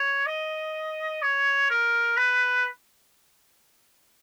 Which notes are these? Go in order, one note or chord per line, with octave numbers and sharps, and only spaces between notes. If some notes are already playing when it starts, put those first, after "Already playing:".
Already playing: C#5
D#5
C#5
A#4
B4